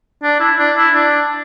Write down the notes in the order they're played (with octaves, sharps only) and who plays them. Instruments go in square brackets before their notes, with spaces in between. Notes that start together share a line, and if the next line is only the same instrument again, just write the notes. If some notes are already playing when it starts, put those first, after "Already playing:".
[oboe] D4
E4
D4
E4
D4